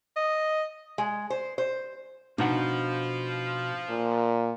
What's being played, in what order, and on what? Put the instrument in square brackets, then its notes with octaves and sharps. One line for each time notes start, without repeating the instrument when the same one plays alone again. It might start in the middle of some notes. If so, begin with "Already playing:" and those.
[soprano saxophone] D#5
[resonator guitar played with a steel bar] G#3
C5
C5
[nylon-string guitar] B2 [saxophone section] F3 [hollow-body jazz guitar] D4 D#4 F#5
[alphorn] A#2